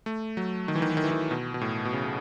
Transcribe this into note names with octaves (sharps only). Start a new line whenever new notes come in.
A3
F#3
D#3
E3
D#3
E3
D#3
E3
D#3
B2
B2
A2
B2
C#3
C#3